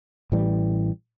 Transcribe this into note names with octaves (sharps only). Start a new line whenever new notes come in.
A1 A2 E3 G3